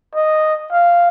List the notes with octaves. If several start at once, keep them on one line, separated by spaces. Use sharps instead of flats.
D#5
F5